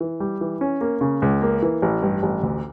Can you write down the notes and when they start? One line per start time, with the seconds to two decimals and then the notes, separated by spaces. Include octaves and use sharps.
0.01 E3
0.20 G3
0.41 E3
0.61 C#4
0.81 A#3
1.01 C#3
1.22 C#2
1.42 A#3
1.62 E3
1.82 A1
2.02 G2
2.23 A1
2.43 D2